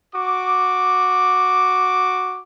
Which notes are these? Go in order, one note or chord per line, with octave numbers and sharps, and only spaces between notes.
F#4 D6